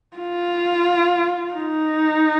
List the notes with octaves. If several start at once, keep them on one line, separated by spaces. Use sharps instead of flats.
F4
D#4